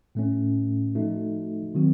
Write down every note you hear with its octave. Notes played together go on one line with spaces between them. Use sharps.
A2 A3 C#4
F3 A3 D#4 F#4
D#3 F#3 C4 F#4